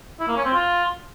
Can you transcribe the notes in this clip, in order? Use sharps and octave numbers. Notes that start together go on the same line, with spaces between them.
E4
A#3
C#4
C4
F4